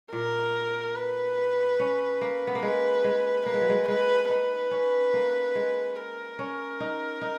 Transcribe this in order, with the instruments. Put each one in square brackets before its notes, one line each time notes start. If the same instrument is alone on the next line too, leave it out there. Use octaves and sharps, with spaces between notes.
[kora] A#2 [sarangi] A#4
[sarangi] B4
[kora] C#4
A#3
B3
A#3
[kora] G#3 [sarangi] B4
[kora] G#3
[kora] A#3 [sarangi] B4
[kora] G#3
F#3
G#3
[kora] G#3 [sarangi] B4
[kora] D#4 [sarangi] B4
[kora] C#4
A#3
G#3
[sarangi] A#4
[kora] C#4
D#4
D#4